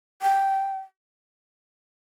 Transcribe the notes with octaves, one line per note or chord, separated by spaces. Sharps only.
G5